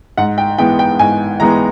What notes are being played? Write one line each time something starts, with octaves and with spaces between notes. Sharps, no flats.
G#2 F#5
G5
E3 G#3 B3 G5
G5
G#2 G#5
E3 G#3 B3 A#5